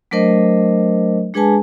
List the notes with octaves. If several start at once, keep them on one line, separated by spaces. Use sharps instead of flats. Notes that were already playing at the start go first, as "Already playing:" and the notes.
F#3 A3 D4 A#4 C5 D#5
G#3 D4 G#4 B4 G#5 A5